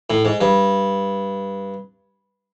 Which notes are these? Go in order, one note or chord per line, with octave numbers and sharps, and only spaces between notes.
A2
G#2
G2